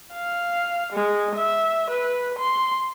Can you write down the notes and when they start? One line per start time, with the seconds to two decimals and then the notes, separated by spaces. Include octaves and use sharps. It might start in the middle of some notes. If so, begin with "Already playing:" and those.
0.14 F5
0.93 G#3
1.35 E5
1.90 B4
2.38 C6